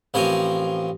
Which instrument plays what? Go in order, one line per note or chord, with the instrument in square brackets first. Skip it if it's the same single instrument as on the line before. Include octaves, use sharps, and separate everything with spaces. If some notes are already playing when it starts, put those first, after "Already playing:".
[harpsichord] A1 F3 C4 A#4 C#5 G#5